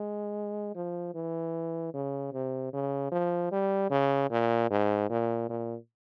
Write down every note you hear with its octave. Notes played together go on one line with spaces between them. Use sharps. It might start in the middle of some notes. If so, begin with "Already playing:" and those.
Already playing: G#3
F3
E3
C#3
C3
C#3
F3
G3
C#3
A#2
G#2
A#2
A#2